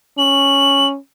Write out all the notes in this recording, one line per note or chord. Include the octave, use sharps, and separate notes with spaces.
C#4 F#7